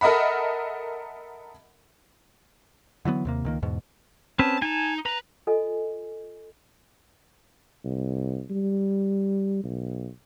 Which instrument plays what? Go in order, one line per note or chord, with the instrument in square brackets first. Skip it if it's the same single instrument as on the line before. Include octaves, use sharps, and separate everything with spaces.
[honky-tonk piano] A4 A#4 D#5 E5 F#5 B5
[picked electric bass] D3 E3 F#3 B3
D#2 C3 A#3
C#2 D#3 A#3
E2 G#2 B2
[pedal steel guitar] C4 C#4 B4 [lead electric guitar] A5
[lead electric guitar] D#4 [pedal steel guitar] G#5 A5
[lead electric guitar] B4 [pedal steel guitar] A#5
[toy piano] F4 A4 D#5 G#5
[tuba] C2
G3
B1